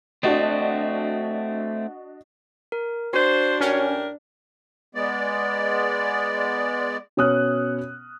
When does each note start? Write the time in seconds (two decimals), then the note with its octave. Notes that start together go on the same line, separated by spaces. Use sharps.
0.23 A3 C4 D4 F#4 D#5
2.72 A#4
3.13 D4 F#4 C5
3.61 A2 C#4 G4 A#4
4.95 G#3 B3 D5
7.17 B2 C#4 C#5 D#6 F6 F#6